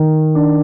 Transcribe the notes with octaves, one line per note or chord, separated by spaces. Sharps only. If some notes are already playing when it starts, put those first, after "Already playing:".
Already playing: D#3
D4